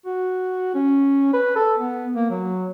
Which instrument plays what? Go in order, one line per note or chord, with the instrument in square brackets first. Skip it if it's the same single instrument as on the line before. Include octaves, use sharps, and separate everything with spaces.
[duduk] F#4
C#4
B4
A4
B3
A#3
F#3